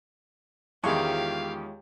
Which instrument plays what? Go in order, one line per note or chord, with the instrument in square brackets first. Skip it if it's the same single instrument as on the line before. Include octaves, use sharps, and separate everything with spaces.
[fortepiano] E2 D#3 [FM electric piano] G#3 F4 C#5 [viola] G4 [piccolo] F5